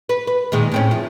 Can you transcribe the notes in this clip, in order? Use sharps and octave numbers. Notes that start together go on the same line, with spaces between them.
B4
B4
A#2 D#3 G#3
A2 C4 C#4
E2 F3